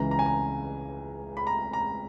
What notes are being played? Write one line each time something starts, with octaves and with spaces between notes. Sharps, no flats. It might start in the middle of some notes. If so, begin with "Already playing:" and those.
Already playing: C#2 C#3 E3 A#5
A#5
G#5
A#5
B5
A#5
A#5